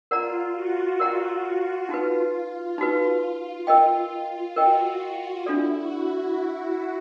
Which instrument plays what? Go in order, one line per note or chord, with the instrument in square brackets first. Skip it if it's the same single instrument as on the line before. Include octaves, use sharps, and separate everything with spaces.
[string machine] F4 [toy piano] A#4 D5 F#5 A#5
[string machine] F#4
[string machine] F#4 [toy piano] A#4 D5 F#5 A#5
[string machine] F4
[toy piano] D#4 F#4 B4
D#4 F#4 B4
[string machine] F4 [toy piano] A#4 D#5 G5
[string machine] F4
[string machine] F#4 [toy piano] A#4 D#5 G5
[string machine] F#4
[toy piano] D4 F4 A4 D5 [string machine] E4
[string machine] F#4